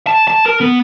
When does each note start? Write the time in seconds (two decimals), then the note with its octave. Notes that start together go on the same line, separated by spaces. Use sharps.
0.07 A5
0.28 A5
0.46 A#4
0.61 B3